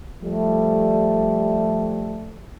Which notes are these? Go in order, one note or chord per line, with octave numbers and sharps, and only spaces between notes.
F3 G3 A3